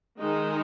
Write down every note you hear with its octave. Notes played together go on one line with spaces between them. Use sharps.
D#3 G#3 D#4